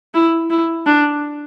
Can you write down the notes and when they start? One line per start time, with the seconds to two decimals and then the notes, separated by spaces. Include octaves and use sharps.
0.14 E4
0.50 E4
0.86 D4